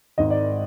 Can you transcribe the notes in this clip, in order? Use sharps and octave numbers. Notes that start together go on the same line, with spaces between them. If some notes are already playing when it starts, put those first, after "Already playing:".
G#1 G#2 D#3 D#5
D5